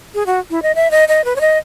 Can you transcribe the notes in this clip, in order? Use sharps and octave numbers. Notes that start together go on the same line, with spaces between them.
G#4
F#4
E4
D#5
E5
D#5
D#5
B4
C#5
D#5